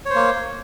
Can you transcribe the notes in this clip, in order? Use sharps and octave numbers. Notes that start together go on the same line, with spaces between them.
A#3 C5 C#5